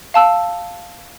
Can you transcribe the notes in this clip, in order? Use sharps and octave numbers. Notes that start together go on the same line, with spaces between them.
F5 A5 E6